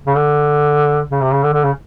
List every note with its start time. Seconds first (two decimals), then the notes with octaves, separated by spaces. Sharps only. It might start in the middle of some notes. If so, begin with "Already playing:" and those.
0.07 C#3
0.16 D3
1.11 C#3
1.22 C3
1.33 C#3
1.43 D3
1.53 D3
1.64 C#3